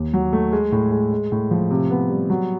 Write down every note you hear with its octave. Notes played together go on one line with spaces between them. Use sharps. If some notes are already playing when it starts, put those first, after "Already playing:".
Already playing: D#2
F#3
A3
G#3
A2
G#3
G#3
A2
F3
C3
B3
G3
F#3